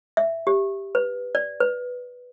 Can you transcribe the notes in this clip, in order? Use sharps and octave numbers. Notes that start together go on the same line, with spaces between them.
E5
G4
B4
D5
B4